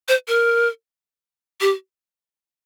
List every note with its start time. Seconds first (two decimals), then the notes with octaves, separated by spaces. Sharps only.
0.08 C5
0.28 A#4
1.61 G4